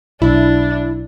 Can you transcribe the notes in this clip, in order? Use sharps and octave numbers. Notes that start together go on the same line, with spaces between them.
B1 D4 E4